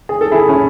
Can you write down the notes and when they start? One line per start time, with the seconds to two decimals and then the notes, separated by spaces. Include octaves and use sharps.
0.09 G#4
0.21 A4
0.32 E4 G#4
0.49 C#4 E4